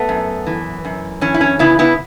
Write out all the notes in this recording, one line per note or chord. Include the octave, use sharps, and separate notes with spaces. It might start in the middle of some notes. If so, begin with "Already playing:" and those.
Already playing: A3 B3
F#2
E3
F#2
E3 C#4
E4
C#4
C#3 B3 E4
B3 E4